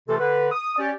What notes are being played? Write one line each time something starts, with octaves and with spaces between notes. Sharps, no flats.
C3 E3 A3 F4 A4
D3 B4
D#6
C#4 G4 D5